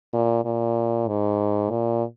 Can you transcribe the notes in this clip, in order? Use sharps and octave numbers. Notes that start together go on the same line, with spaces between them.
A#2
A#2
G#2
A#2